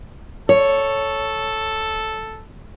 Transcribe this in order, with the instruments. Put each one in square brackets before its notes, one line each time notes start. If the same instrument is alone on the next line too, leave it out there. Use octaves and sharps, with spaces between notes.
[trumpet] A4 [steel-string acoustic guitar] C#5